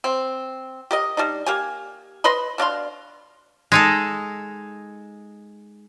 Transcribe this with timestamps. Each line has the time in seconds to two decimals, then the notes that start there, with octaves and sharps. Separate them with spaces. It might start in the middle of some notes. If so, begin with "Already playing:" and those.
0.04 C4
0.91 G4 A#4 D#5
1.17 G3 D4 D#4
1.46 A#3 G4 G#5
2.24 B4 D#5 B5 C6
2.58 B2 D4 F5 C6
3.72 G#3 D#4 A4